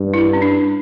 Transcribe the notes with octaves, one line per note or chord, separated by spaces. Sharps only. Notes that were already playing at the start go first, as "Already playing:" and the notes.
Already playing: G2
E4
C#4
D4